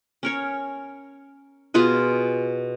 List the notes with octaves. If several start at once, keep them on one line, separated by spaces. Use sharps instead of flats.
C#4 A#4 C#5
B2 F4 G#4 B4